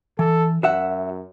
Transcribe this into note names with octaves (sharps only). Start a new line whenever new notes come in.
E3 A4
F#2 F#4 E5 F#5